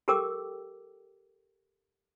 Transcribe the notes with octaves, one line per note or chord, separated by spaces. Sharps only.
G4 A4 A#4 G5 D6 E6